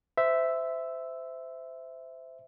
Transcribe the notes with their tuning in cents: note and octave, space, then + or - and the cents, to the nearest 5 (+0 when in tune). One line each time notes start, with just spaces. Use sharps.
C5 -25 E5 +0